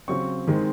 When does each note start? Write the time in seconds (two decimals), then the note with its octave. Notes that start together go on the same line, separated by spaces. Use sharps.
0.08 C#3 F#3 C4 C#6
0.48 D#3 G#3 C4